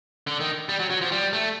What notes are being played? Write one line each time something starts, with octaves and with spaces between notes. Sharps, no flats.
D3
D#3
G3
F#3
F#3
F3
G3
A3